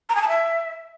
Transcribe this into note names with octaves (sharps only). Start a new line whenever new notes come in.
A#5
G#5
A5
E5